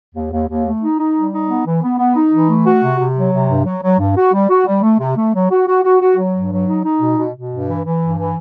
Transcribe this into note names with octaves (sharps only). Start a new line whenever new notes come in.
D#2
D#2
D#2
A3
D#4
D#4
G3
D#4
B3
E3
B3
B3
D#4
E3
A3
F#4
C3
C3
F#3
C3
G2
F#3
F#3
G2
F#4
G3
F#4
G3
A3
C3
A3
F#3
F#4
F#4
F#4
F#4
F#3
G2
F#3
D#4
D#4
B2
B2
B2
G2
E3
E3
G2
E3